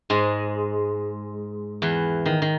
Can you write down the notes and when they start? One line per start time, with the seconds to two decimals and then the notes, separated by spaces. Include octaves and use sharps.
0.10 G#2 G#3
1.82 E2 E3
2.26 D#3
2.42 D#3